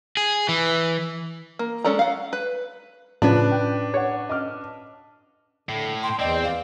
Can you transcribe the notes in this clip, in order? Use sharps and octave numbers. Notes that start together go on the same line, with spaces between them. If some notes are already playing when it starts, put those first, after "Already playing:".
G#4
E3
A#3
G#3 C#4 A4 D5 A#5
F5 F#5
B4
A2 C#3 F3 C#4 D4 B4
G5
C#5 F#5
D#5 D6 F6
A2 D3
G5 C6
E2 C4 D5 D#5 G5
F5